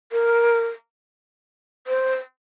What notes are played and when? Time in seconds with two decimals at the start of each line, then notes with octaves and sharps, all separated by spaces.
0.12 A#4
1.87 C5